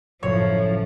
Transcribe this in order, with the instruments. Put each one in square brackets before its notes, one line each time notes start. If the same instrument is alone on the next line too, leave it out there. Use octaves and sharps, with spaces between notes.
[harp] F#1 A2 [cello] F3 [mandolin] C#5